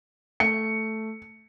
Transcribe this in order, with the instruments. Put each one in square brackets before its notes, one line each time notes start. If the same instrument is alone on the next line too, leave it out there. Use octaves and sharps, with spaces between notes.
[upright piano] A3 [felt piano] C#7